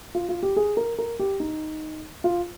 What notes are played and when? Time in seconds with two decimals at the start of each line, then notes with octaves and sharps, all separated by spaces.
0.15 F4
0.29 F4
0.43 G4
0.56 G#4
0.77 A#4
0.98 A#4
1.19 G4
1.40 D#4
2.24 F4